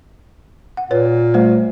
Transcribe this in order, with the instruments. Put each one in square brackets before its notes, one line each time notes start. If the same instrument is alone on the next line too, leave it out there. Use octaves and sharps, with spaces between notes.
[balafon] F#5
[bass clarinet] A#2 [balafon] B4 C#5
[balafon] G3 A3 C5